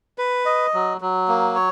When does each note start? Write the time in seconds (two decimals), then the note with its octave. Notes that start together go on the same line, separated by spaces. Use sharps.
0.18 B4
0.45 D#5
0.74 F#3
1.01 F#3
1.28 A#3
1.55 C#5